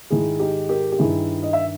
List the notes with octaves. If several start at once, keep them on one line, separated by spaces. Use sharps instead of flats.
G#2 D#3 G#3 E4 G#4
D#4 G4
G4 A#4
G4
G2 D#3 G3 E4 G#4
D#5
E5